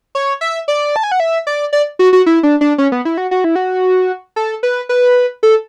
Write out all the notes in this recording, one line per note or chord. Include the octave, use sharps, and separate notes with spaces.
C#5
E5
D5
A5
G#5
F#5
E5
D5
D5
F#4
F#4
E4
D4
D4
C#4
B3
E4
F#4
F#4
E4
F#4
A4
B4
B4
A4